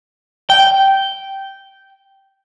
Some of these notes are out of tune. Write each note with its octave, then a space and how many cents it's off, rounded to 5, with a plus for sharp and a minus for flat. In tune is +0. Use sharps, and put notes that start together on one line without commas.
G5 -10